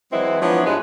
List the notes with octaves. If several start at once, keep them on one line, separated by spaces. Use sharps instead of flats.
E3 F#3 G#3 C4 E4 B4
F3 F#3 B3 D4 E4 C#5
G2 G#3 B4